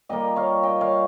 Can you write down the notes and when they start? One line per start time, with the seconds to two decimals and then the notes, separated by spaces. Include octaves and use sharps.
0.09 A#2 G3 A#3 D#5 G5
0.36 C#5 F5
0.63 D#5 G5
0.81 C#5 F5